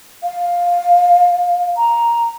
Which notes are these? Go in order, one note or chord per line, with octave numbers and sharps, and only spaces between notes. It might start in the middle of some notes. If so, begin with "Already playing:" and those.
F5
A#5